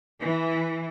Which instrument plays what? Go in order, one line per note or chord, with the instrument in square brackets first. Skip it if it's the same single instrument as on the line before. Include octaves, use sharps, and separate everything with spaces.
[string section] E3